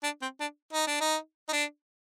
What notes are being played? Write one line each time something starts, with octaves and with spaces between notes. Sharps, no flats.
D4
C4
D4
D#4
D4
D#4
D#4
D4